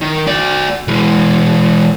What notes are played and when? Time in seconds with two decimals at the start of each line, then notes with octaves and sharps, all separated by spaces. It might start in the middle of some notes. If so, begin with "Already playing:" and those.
0.01 D#3
0.27 F#4 D5
0.88 E3 G#3